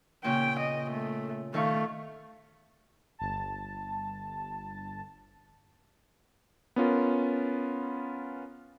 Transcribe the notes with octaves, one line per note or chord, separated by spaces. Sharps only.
A#2 C#3 C#4 G5
D#5
A3
D#3 A3 F5 C#6
G1 A5
B3 C#4 F4 A#4